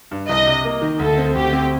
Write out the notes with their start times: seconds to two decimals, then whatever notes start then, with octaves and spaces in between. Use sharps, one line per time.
0.11 G2
0.29 C2 D#5
0.46 C3
0.64 A#3
0.82 D#3
0.99 D2 A4
1.18 C4
1.35 D2 G4
1.53 C4